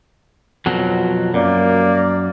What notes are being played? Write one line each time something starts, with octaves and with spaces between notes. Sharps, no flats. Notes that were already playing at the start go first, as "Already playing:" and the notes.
F2 B2 F#3
F#2 A#3 D5